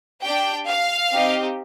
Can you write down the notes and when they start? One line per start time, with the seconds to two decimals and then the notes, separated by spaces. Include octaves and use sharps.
0.22 D4 G4 G5
0.67 F5
1.12 C4 D#4 G4